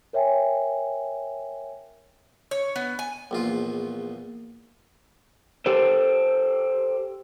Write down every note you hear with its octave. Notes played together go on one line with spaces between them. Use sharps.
A#4 C#5 E5 G5 G#5
C#5
B3
G#5
A#1 E2 F4
G4 A4 C5